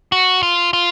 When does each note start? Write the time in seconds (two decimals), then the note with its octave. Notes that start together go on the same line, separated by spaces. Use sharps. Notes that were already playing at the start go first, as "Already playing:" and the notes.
0.12 F#4
0.43 F4
0.73 F4